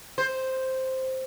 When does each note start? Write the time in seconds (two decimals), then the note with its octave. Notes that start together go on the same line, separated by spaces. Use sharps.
0.18 C5